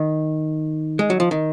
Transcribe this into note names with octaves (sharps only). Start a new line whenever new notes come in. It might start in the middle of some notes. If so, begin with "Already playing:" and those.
Already playing: D#3
G#3
F#3
F3
D#3